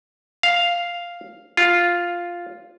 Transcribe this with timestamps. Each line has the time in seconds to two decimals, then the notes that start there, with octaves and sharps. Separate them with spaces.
0.43 F5
1.57 F4